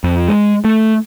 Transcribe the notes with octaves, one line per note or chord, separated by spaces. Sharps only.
F2
G#3
A3